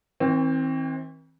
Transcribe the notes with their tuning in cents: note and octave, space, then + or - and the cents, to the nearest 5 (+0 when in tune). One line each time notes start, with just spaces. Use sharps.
E3 -45 C4 +15